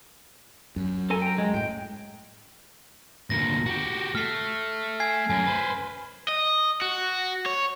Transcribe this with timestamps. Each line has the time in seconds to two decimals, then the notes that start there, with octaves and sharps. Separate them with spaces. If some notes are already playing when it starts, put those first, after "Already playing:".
0.76 F#2
1.10 A4 A#4 G#5
1.22 G5 A#5
1.38 G#3
1.54 A2 G5
3.30 D2 A#2 A#6
3.66 F#4 G4
4.15 A3 F6 C7
5.00 G#5 G#6 C7
5.30 F#2 G#5
5.46 B4 C5
6.28 D#5
6.82 F#4
7.46 C#5